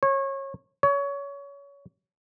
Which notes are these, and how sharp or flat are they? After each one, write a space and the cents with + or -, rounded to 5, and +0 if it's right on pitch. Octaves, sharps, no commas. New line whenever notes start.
C#5 -25
C#5 +25